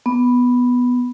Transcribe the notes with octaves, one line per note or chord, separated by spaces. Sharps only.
B3